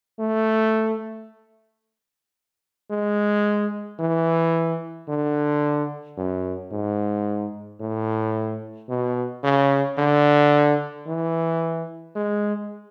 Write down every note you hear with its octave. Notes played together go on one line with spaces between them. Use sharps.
A3
G#3
E3
D3
F#2
G#2
A2
B2
C#3
D3
E3
G#3